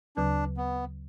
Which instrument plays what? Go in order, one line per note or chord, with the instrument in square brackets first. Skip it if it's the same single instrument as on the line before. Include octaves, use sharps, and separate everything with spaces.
[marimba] D2 C#3 F#3 [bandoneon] D4
[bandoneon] B3